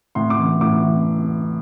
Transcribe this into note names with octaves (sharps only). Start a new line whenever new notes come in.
A2 C6
D6
E3
A2 D6
E3